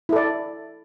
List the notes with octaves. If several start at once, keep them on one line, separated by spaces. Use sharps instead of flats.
E4 A4 D5